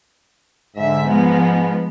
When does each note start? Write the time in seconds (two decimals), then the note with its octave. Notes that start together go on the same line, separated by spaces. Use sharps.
0.76 G#2 D3 E5
1.07 F3 G#3 B3